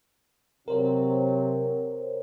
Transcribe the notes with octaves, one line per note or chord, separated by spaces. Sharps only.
C3 F#3 C4 A#4 C5 C#5